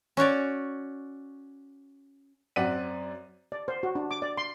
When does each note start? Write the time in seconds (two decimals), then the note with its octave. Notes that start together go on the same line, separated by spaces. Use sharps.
0.17 C#4 F#4 C#5 D5
2.56 F#2 C4 D5 F#5 B6 D#7
3.52 D5
3.68 C5
3.83 F#4
3.95 D4
4.11 D6
4.22 D5
4.38 C6